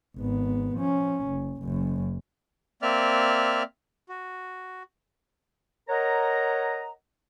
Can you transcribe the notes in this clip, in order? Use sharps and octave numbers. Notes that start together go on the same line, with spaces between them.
G#1 B3
F3 C#4
F#1
F#1 F#2
A#3 C4 D5 E5 F6
F#4
A#4 C#5 D#5 F#5 A#5